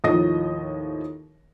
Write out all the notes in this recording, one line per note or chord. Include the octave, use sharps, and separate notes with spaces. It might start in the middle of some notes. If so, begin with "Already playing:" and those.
D#2 A2 F3 D#5 D#6 A#6